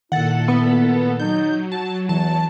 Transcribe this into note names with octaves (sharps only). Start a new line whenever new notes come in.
A#2 D#3 E4 A4 F#5 A6
B3
F#3 D#4 G6
F#4 A5
E2 E3 A5